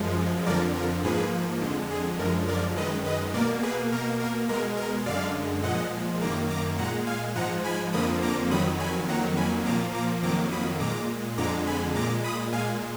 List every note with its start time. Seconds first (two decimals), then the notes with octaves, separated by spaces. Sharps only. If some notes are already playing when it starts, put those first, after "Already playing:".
Already playing: F#2 F3 G#3
0.47 F2 D3 F3 A#4 D5
0.76 A#4
1.04 G#2 F3 A#3 G#4 B4
1.61 F2 D3 G#3
1.91 G#4
2.19 F#2 D3 F3 G#3 A#4
2.48 A#4 D5
2.76 F#2 D#3 G#3 B4 D#5
3.05 B4 D#5
3.34 B2 A#3 A#4 D5
3.63 G#4 B4
3.92 B2 A#3 A#4
4.20 A#4
4.49 B2 G#3 A#4
4.77 A#4
5.06 F#2 D3 G#3 D5 F5
5.63 A#2 F3 G#3 D#5 F#5
6.21 F#2 D#3 A#3 A#5 D6
6.50 A#5 D6
6.78 A#2 G#3 F#5 A#5
7.07 F5 G#5
7.36 G#2 F3 G#3 F#5 A#5
7.64 G#5 B5
7.93 F2 D3 F3 A#3 B5 D#6
8.22 A#5 D6
8.51 F2 D#3 F#3 B5 D#6
8.80 G#5 B5
9.08 F2 D#3 F#3 A#3 F#5 A#5
9.36 G#5 B5
9.65 A#2 F3 A#3 A#5 D6
9.94 A#5 D6
10.23 F2 D#3 F#3 A#3 A#5 D6
10.52 B5 D#6
10.80 A#2 G#3 A#5 D6
11.38 F2 D3 G#3 A#5 D6
11.67 G#5 B5
11.95 A#2 G#3 A#5 D6
12.24 B5 D#6
12.52 A#2 G#3 F5 G#5